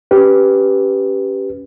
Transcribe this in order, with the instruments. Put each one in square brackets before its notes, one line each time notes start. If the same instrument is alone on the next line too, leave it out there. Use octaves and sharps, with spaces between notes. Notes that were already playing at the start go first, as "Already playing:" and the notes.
[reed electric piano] C#4 G4 B4